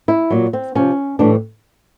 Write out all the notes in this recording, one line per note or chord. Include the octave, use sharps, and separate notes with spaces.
E4
A#2 F#3
C4
C3 F3 C#4
A2 E3 G3 D4